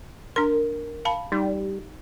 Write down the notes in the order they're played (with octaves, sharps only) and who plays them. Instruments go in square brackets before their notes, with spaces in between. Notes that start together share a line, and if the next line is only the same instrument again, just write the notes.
[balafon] D4 C6 [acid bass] A#4
[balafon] F5 A5 B5
[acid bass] G3 [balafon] D#4